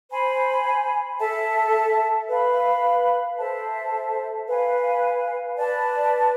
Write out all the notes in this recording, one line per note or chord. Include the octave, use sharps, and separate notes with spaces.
C5 G#5 B5
A4 E5 A5
B4 F5 B5
A4 C5 E5 A5
B4 F5 G#5
B4 D5 A5